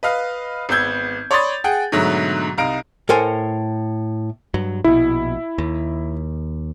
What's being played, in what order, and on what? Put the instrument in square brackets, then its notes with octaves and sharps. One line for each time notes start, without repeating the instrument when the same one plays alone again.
[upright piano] B4 D#5 F5
G#1 B3 E6 G6 G#6
C#5 D5 B5 C6 D#6 A6
G#4 F#5 G5
G#2 B2 D3 F#3 A3
C2 D#4 F5 A#5 D7
[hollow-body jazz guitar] A2 A4 A#4 C5 G#5
[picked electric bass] G2 F#3
[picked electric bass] A#1 B2 [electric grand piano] E4
[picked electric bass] D#2